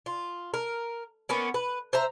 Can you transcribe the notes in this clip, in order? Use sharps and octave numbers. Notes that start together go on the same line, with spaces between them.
F4
A#4
A#3 B3 C#4
B4
C5 E5 A#5